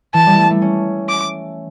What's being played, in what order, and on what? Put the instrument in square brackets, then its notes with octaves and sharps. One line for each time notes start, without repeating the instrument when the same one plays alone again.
[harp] E3 [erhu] A5
[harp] G3
A3
A3
C#4
[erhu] D6